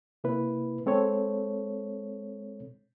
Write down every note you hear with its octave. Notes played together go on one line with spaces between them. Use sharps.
C3 A#3 E4 B4
G#3 C4 A4 C#5